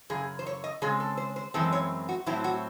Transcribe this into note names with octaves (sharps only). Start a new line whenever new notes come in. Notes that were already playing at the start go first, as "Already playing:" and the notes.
F#2 C#3 G#4
C5
C#5
D#5
C#3 G#3 C4 G#4
A4
C5
C5
F#2 E3 G#3 C4 A4
C#5
F#4
A2 F#3 C4 E4
F#4